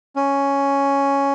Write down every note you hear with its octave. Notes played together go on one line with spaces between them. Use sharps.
C#4